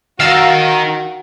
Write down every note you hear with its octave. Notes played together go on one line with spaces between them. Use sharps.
D#3 F#4 A#4 F5 E6 A6